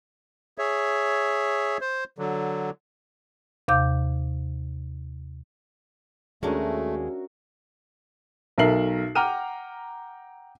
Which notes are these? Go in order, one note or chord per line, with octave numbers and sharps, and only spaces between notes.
G#4 C#5 E5
C5
D3 F#3
D#2 C3 F5 D6 G6
D#2 G#3 A3 C#4 D4 F#4 A#4 E5
B1 A4 A#4 E5 C7 F#7
F#5 G5 A#5 D6 F6 D#7